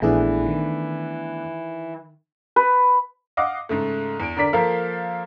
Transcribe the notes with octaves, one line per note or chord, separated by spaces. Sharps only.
A#1 E3 A3 B3 D4 E4 G#4
D#3
B4
D#5 F5 F#5 D6
G#2 C#3 A3
E2 D7
D3 A#4 D5 B6
F3 A#3 A4 A#4 F5